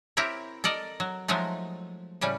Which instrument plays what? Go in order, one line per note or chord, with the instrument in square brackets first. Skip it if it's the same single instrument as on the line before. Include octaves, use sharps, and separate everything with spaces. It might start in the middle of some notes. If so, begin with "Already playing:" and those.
[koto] C4 E4 G4 A#4 C#5
A4 A#4 D5 D#5
F#3
F3 F#3 G#3 A3 D#4
A2 C#3 G3 C#4